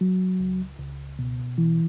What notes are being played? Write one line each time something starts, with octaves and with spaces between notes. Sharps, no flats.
F#3
C#2
C#2
B2
E3